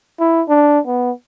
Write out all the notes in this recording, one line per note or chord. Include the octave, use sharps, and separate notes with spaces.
E4
D4
B3